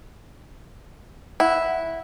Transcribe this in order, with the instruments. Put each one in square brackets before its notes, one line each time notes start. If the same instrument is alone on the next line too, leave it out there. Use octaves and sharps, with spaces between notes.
[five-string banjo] E4 [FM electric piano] F#5